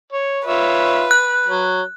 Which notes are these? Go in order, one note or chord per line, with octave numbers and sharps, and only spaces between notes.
C#5
F4 B4 C#5 E5
F#6
F#3